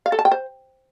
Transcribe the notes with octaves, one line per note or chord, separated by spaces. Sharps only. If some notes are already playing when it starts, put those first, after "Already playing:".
F5
A4
A5
G5
C5